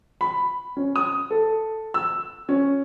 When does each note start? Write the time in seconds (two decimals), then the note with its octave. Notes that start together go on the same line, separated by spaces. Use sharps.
0.21 B5
0.77 C#4
0.96 D#6
1.31 A4
1.94 E6
2.49 C#4